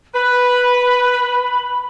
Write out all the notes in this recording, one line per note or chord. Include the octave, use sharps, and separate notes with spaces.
B4 B5